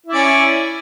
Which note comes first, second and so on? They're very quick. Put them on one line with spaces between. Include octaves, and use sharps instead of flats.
E4 D5 C#4